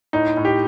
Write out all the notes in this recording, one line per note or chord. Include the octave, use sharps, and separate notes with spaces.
A2 D#4
A2
G4